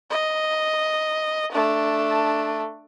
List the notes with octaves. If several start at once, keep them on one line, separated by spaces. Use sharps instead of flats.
D#5
A3 D4